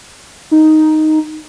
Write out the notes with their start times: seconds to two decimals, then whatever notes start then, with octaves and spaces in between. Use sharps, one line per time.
0.51 D#4